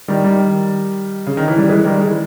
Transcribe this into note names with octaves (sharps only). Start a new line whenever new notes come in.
D#3 G3
D#3 G3
C#3
D#3
E3
G3
E3 G#3
D#3 G3
E3 G#3